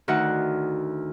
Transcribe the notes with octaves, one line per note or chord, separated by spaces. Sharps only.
D2 D#3 F#4 F#5